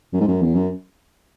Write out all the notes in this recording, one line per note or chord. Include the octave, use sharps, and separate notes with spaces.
F#2
G#2
F#2
E2
F#2